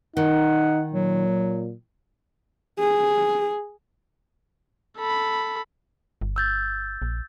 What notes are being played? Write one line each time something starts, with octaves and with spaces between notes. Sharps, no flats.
D#3 D#4 F#5
A#2 F#3
G#4
A4 B5
G1
E6 G6 A6
A#1